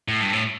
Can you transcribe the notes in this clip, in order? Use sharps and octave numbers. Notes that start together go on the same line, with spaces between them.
A2
G2
A2